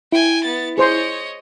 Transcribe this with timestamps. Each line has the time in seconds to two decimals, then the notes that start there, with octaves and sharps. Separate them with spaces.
0.12 E4 G5 G#5
0.44 B3 A6
0.78 G#4 C5 C#5 D#5 C6